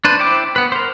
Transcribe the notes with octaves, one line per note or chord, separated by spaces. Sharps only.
D4 B4 C5
E4 C5 G5 D6
B3 B4
A#4 C5